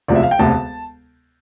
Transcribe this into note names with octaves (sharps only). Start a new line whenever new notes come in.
E1 D2 C3 F3 D5
E5
F5
G5
E1 D2 C3 A5